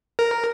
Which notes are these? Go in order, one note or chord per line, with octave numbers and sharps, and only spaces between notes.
A#4